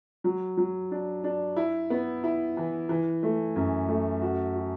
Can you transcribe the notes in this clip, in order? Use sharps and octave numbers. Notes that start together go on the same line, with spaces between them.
F#3
F#3
D4
D4
E4
B3
E4
E3
E3
A3
F#2
A3
F#4
F#4